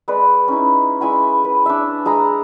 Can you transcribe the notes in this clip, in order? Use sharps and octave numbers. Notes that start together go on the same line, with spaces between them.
G#3 B4 D5
C#4 D#4 E4
G#3 E4 G#5 B5
B4
D4 E5
G#3 G#4 A#5 B5